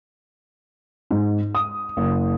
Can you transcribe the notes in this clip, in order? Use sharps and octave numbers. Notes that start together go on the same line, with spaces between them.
G#2
D#6
F#1